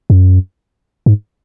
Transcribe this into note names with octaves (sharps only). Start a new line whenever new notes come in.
F#2
G#2